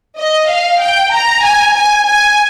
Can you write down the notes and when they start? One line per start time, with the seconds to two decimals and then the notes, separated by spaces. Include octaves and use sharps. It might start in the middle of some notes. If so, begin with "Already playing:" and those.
0.19 D#5
0.50 F5
0.81 G5
1.13 A#5
1.45 G#5
1.76 G#5
2.07 G#5